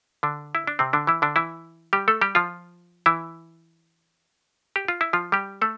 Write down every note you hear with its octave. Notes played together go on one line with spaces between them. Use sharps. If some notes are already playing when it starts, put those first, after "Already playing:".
D3 D4
E4
D4
C3 C4
D3 D4
E3 E4
D3 D4
E3 E4
G3 G4
A3 A4
G3 G4
F3 F4
E3 E4
G4
F4
E4
F3 F4
G3 G4
A3 A4